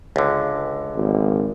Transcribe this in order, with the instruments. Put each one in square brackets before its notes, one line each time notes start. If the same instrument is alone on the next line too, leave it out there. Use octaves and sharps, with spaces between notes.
[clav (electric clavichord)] C#2 D3
[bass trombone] G#1